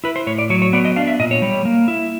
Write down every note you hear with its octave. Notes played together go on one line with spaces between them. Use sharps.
E4 B4
C5
A2 C#5
D5
F#3 C#5
C#5
B3 D5
D#5
D4 F5
E5
A#2 D#5
C#5
G3
A#3
E4